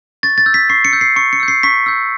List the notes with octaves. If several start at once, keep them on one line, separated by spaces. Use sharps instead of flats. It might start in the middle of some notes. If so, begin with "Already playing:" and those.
C#6 A6
A6
E6 G6
B6
C#6 C7
C#7
E6 G6
C7
C#6 C#7
C#7
E6 G6
C7
C#6 B6
E6 G6